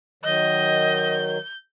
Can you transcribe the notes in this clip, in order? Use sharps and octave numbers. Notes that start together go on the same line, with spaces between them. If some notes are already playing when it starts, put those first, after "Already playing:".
D#3 F#3 D#5 G6